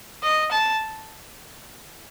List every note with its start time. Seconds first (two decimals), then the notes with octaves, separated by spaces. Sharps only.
0.23 D#5
0.52 A5